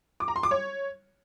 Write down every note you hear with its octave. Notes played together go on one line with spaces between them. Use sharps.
D6
A#5
C6
D6
C#5